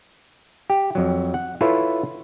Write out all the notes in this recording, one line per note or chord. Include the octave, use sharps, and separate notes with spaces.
G4
F2 F#3
F#5
E4 F4 A4 B4 C#5